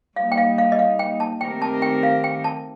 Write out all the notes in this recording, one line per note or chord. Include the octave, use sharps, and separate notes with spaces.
G3 A#3 D#4 F5
G5
F5
F5
D#5
F5
G5
A5
D#3 A3 C4 G4 A#4 G5
A5
G5
F5
G5
A5